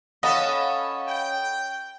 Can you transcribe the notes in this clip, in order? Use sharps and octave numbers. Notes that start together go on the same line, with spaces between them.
C#4 A4 D#5 F5 F#5 B5
G5